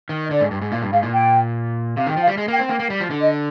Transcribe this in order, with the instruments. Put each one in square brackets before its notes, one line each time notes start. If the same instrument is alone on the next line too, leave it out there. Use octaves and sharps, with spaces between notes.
[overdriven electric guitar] D#3
[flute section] D#5
[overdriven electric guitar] D3 [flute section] D5
[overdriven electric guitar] G#2
G2
G#2
[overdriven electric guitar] A#2 [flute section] F5
[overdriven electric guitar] G2
[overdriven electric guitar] G#2 [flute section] F5
[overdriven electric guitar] A#2
[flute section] G5
[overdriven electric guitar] C3 [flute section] F5
[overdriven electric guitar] D#3 [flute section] G5
[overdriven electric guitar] F3 [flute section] F5
[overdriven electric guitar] G3
G#3
[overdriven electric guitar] A#3 [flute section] G5
[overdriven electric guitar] C4
[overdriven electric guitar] A#3 [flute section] G5
[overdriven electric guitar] A#3
G3
F3
D3
[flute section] D#5